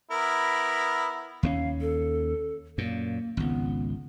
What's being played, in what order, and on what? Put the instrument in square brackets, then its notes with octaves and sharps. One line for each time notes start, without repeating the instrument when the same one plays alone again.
[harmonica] B3 E4 A#4
[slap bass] D#2 A#3 C#4 [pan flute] F5
[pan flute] A4
[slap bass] F#2 A#2 [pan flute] A#3
[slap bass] G#1 C#2 [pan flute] B3